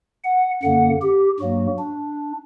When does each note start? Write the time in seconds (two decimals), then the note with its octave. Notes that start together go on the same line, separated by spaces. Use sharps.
0.24 F#5
0.62 F#2 D3 A#3 F#5
1.02 G4
1.40 G2 F#3 A#3 F#4
1.78 D4